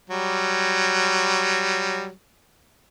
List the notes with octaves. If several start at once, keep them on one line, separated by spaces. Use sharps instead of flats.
F#3 G3